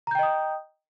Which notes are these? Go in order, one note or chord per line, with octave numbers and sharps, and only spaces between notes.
D#5 G5 A#5 D#6 G6